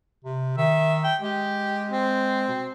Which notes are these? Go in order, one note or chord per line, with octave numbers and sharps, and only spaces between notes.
C3
D#3 E5
G5
G#3 G4
C4
B2